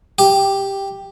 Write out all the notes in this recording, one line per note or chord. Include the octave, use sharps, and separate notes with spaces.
G4